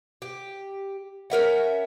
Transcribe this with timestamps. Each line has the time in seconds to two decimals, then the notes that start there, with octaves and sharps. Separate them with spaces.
0.22 G4
1.30 C#4 A#4 E5 F#5